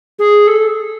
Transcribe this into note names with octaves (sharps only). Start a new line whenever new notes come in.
G#4
A4